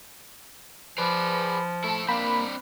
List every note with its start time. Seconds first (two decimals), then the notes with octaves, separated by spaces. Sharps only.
0.98 F3 G#4 B4 D5
1.84 A3 E4 A4
2.09 A#3 C4 D4 B5